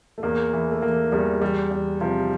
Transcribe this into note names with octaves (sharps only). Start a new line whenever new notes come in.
A3
E2 A#3
E3
A3
E3 A#3
E2 G3
E2 G3
E2
C3 F3